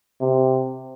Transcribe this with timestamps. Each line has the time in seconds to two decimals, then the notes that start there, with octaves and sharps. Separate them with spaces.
0.21 C3